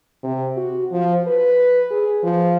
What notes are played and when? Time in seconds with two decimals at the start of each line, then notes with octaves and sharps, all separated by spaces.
0.23 C3
0.57 F#4
0.92 F3
1.27 B4
1.91 G#4
2.23 F3